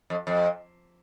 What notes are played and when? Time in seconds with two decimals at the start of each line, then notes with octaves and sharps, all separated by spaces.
0.10 F2
0.27 F2